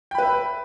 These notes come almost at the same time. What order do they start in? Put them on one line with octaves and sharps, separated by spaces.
G5 B5 B4 E5